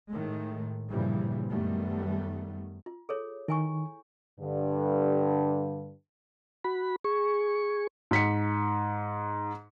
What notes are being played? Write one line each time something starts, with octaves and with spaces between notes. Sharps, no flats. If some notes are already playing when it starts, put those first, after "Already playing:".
A2 D#3 G#3 A3
G2 A#2 C#3 E3 F3 G3
F#2 D#3 G3 A3 B3
F4
G#4 A4 C#5
D#3 E4 G#5 C#6
G2 D3
F#4 B5
G#4 C#6
G#2 B6 C#7